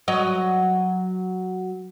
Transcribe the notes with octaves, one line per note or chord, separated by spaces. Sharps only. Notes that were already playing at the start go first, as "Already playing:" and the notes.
F#3 D#5